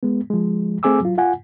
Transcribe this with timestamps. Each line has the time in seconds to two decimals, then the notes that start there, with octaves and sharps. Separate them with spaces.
0.03 G#3 B3
0.30 F3 G#3
0.83 A3 C4 G#4 G#5 D6 E6
1.01 F#3 F4
1.18 F4 F#5 G#5